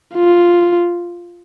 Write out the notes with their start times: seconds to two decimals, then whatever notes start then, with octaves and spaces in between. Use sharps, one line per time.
0.15 F4